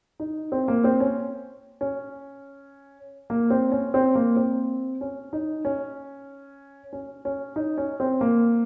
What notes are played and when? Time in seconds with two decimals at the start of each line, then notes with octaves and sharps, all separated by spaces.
0.20 D#4
0.52 C4
0.68 A#3
0.84 C4
1.00 C#4
1.81 C#4
3.30 A#3
3.50 C4
3.72 C#4
3.94 C4
4.15 A#3
4.36 C4
5.01 C#4
5.33 D#4
5.65 C#4
6.93 C#4
7.25 C#4
7.56 D#4
7.78 C#4
8.00 C4
8.21 A#3